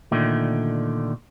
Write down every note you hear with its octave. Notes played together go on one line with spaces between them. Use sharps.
A#2 D3 D#3 A3